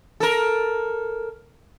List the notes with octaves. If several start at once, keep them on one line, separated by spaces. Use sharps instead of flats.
A4 A#4